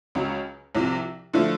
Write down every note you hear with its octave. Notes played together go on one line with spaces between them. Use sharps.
C#2 C#3 F#3
C2 C3 F3
D3 F3 A3